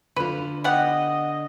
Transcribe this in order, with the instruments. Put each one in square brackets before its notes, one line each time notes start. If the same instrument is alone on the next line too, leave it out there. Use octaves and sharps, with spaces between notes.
[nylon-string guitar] D3 F4 [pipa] B4
[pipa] B3 G4 F#5 [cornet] D#5